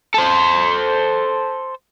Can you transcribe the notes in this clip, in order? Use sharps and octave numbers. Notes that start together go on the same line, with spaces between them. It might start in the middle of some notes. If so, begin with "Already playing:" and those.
A4 C5